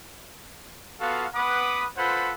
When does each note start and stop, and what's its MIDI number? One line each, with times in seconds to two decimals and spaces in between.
1.00 1.26 59
1.00 1.26 65
1.00 1.26 66
1.00 1.26 69
1.00 1.26 77
1.34 1.85 59
1.34 1.85 71
1.34 1.85 78
1.34 1.85 83
1.34 1.85 86
1.34 1.85 87
1.97 2.33 65
1.97 2.33 69
1.97 2.33 71
1.97 2.33 72
1.97 2.33 78
1.97 2.33 83